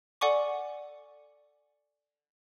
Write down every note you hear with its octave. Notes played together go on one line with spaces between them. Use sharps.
A4 D5 F#5 G#5 C#6 D6